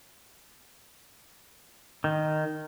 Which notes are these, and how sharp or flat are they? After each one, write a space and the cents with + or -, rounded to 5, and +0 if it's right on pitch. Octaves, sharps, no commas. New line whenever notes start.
D#3 -10